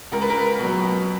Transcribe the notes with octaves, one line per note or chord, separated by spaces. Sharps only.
C#2 A#4
B4
A#4
B2 F#3